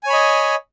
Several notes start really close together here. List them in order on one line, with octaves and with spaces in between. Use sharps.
G#5 C#5 B5 D#5